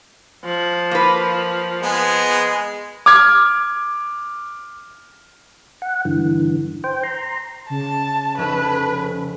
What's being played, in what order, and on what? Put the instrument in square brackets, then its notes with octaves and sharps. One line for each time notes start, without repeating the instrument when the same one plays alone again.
[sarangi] F3
[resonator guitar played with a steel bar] A#3 B4
[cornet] G#3 [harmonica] B3 G#4
[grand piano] D6 F6 G#6
[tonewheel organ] F#5
G2 D3 E3
C5 G5
A#5 C6
[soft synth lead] C#3 [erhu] A5
[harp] F1 C#4 A4 [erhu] B4